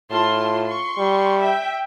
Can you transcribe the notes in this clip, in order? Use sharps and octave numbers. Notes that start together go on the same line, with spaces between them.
A2 F4 A5 C6
C6 C#6
G3
E5 G5